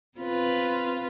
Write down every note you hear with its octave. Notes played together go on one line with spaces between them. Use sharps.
C4 F4 B4